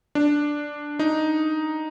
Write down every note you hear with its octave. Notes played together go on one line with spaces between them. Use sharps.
D4
D#4